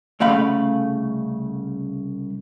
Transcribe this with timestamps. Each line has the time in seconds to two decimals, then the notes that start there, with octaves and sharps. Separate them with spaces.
0.20 C2 C#3 A3 F5 B5